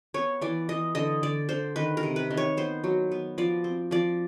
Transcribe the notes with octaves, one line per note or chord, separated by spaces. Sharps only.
B3 C#5
E3 D5
E3 D#5
D3 D#5
D3 D5
D3 C5
D#3 B4
A#4
C3
B4
D#3
C#5
B3 C5
F#3
B3
F3 D5
C4
F3 D5